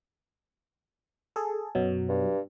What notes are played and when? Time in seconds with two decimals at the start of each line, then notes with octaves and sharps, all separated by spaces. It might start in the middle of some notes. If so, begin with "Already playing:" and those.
1.36 G#4 A4
1.75 F#2 B2 F#3
2.09 G2